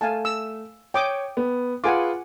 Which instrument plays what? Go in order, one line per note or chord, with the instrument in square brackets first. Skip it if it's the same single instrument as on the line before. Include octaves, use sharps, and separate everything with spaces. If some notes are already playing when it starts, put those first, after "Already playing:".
[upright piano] A3 [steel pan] F5 G#5 A5
[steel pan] E6
[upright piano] C#5 [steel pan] G5 D6 D#6
[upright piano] B3
[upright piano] F4 G#4 B4 [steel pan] F#5 G#5 D6